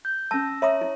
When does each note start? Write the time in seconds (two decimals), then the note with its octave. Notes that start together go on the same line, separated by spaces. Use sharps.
0.05 G6
0.31 C#4 A5 E6 A#6
0.62 C#5 E5 A#5 D#6
0.81 E4